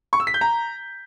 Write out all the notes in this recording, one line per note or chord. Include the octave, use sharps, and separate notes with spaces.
C#6
E6
B6
G6
A#5